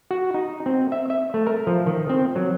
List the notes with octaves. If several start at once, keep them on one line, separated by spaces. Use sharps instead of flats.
F#4
D#4
C4
E5
E5
A3
A#4
F3
D#3
C4
F#3